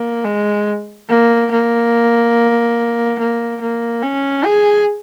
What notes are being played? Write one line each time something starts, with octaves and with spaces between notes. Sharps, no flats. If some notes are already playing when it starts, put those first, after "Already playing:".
Already playing: A#3
G#3
A#3
A#3
A#3
A#3
C#4
G#4